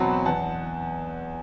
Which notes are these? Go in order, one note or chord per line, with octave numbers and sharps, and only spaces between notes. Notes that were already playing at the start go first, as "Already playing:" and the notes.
Already playing: E2 B2 F#3 C4 F#5 A5 B5
E2 F#5 A5